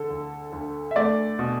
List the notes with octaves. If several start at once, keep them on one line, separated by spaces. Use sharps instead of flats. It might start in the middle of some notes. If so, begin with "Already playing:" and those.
Already playing: D3 A4
D2
D2
E5
A3 D5
B2